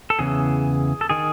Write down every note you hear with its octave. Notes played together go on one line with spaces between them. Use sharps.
A4
E2 C#3 E3 G#4
A4
D#3 G#4